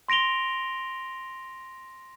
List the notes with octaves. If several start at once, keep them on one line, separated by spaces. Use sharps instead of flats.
C6 A#6 D7 F7 G7